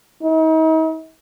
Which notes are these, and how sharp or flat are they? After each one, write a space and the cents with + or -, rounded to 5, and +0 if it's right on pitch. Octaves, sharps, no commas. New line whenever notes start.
D#4 +40